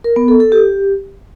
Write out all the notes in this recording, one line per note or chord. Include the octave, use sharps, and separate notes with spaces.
A#4
B3
A4
A4
G4